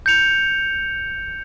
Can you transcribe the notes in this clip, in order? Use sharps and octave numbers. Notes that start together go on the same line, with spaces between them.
G6 C#7 F7